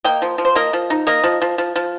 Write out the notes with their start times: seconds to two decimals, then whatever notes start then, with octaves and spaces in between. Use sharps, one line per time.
0.04 A#3 D#5 G5
0.22 F3
0.38 F3
0.45 C5
0.56 A#3 A#4 D#5
0.73 F3
0.90 D#4
1.07 A#3 A#4 D#5
1.24 F3
1.42 F3
1.58 F3
1.76 F3